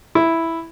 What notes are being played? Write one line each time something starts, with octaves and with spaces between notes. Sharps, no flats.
E4